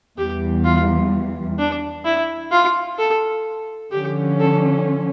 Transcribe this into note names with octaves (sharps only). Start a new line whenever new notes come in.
E2 E3 G3 G4
F4
D4
E4
F4
A4
D3 F3 C#4 G4
A4